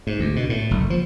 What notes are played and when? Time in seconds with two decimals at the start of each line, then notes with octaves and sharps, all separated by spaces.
0.07 G#2
0.20 D2
0.36 B2
0.50 A2
0.71 F#1
0.90 F3